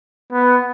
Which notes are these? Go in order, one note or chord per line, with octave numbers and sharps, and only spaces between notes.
B3